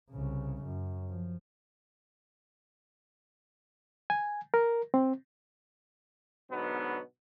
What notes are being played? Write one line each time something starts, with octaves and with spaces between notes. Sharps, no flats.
C2 C#3
F#2
F3
G#5
A#4
C4
G#2 B2 D3 F#3 B3